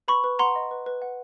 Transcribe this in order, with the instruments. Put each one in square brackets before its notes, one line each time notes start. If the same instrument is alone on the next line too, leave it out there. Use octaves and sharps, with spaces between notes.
[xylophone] B4 B5 C#6
B4
F#5 A#5 C6
D#5
B4
B4
F#5